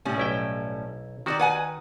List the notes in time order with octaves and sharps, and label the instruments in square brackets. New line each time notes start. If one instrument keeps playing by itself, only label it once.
[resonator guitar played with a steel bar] A2 G3 C#4
[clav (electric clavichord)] B1 E4 G5
[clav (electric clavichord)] D#3 F#4 [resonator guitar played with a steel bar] G4 C5 D5
[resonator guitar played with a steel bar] B4 F#5 G#5